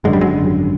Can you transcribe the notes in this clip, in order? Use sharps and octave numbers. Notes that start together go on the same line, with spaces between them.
G#1 F#2 D3 G#3
G3
F#3 G#3